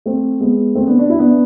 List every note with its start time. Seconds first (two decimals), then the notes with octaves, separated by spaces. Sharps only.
0.06 A3 C4
0.40 G#3 B3
0.75 A3 C4
0.87 B3 D4
0.99 D4
1.10 E4
1.19 B3 D4